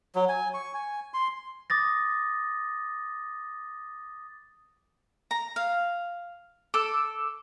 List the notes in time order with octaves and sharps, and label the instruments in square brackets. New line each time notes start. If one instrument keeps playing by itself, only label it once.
[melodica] F#3
G#5
C#6
G#5
C6
[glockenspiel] D6 D#6 A6 A#6
[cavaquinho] A#5
F5
[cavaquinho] A4 [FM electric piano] D6 E6